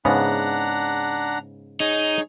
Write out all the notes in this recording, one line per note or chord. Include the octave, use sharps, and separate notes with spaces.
G#2 C#3 B3 D4 F#5 A#5
D#4 G#4 C#5